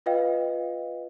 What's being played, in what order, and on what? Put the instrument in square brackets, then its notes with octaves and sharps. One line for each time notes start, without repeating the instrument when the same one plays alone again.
[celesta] F4 B4 D#5 F5 G5